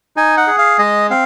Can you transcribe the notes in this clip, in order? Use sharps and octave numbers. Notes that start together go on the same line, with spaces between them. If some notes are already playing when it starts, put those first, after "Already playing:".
D#4 G#5
F#5
G#4
F5
G#3 D#5
C4 F5